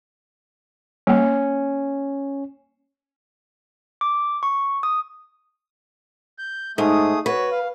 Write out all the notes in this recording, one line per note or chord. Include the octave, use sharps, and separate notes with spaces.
G3 A#3 C#4
D6
C#6
D#6
G6
G#2 A3 G#4 D#6
F#4 B4 C#5
F5